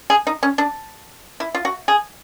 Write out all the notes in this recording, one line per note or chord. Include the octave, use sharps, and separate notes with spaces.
G#4
D#4
C#4
D4
E4
F4
F#4
G#4